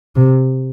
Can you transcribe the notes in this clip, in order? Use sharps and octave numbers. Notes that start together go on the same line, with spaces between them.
C3